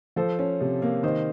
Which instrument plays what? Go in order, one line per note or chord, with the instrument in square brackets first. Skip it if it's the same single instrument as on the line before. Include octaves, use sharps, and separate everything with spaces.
[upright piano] F3 [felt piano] A4 C5
[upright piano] C#4
C3
A#3
[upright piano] D#3 [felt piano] C5 D#5